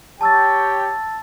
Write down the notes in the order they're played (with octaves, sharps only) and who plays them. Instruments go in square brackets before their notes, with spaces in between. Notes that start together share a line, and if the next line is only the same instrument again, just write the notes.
[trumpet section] G4 C#5 G5 [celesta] A5 E6 A6